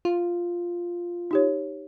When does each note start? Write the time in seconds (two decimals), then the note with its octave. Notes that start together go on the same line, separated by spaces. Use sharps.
0.05 F4
1.31 D#4 G4 C#5